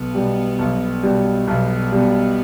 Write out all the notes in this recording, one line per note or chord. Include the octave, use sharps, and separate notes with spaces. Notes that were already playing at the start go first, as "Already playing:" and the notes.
Already playing: B1 B3
B2 G3
B1
B2 G3
B1 B3
B2 G3